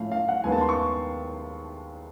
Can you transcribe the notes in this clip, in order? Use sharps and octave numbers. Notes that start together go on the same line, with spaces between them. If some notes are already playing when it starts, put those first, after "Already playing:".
Already playing: A2 F3 A3 C#4 F5
F5
F#5
D#2 D#3 G#3 B3 G#5
A5
C6
C#6